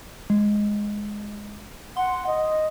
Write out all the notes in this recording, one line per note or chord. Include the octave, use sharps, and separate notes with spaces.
G#3
F#5 C6
D#5